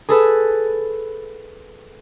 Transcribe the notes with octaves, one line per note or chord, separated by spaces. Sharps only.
G#4 A4 B4